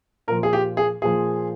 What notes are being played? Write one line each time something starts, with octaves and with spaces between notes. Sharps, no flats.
A#2 F3 A#4
G#4
G4
G#4
A#2 F3 G#4